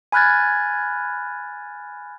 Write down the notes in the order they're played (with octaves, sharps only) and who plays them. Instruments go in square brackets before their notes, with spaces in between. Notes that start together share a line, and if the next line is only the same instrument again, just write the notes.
[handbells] G#5 B5 F6 F#6 G#6 A6